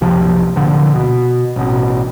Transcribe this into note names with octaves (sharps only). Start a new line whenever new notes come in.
F#1 C#2 C3 F3
D1 A#2 D3 F3
B2
A1 B2